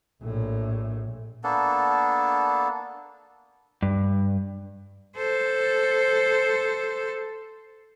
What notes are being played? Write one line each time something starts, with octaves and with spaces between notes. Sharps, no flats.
A#1 A2
A#3 B3 D4 A4
G2
A4 C5